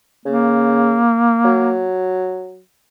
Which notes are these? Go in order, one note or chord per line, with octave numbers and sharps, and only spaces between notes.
C#3 A#3
F#3